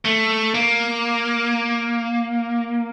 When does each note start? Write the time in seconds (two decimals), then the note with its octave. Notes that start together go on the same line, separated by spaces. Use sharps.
0.05 A3
0.54 A#3